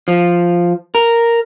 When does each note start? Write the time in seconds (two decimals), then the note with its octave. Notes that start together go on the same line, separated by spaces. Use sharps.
0.08 F3
0.95 A#4